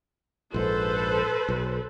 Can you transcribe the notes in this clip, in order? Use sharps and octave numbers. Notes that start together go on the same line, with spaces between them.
A#1 G#2 A4 B4 C5
B1